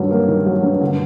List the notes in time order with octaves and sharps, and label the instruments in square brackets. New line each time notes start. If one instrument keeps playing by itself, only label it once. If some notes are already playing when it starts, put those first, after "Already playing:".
Already playing: [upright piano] G2 D#3 F#3
A#3
D#3
F#3
G2
D3